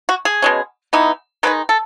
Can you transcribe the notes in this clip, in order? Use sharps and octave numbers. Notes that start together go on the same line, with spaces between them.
F#4
G#4
B2 G#3 C#4
E3 B3 D#4
D#3 G#3 D#4 B4
A4